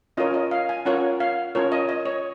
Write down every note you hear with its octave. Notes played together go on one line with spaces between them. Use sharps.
C#4 F4 A#4 C#5 D#5
D#5
F5
G#5
C#4 F4 A#4 C#5 F#5
F5
C#4 F4 A#4 C#5
D#5
D#5
C#5